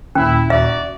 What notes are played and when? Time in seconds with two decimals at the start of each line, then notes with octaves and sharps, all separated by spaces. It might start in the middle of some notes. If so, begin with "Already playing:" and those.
0.15 D#2 A#2 C#4 E4
0.50 D#4 F#4 D5 E5